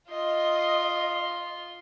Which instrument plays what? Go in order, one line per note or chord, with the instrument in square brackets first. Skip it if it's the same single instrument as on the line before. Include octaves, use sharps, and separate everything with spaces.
[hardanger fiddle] F4 C6 [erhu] D#5